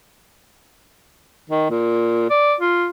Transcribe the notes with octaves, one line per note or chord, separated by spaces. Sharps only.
D#3
A#2
D5
F4